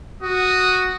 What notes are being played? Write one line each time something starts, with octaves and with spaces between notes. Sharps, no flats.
F#4 D#6